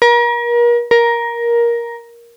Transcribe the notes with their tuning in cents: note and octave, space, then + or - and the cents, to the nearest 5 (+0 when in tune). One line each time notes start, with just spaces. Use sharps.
A#4 +35
A#4 +10